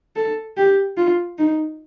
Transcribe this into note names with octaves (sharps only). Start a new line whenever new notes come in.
A4
G4
F4
D#4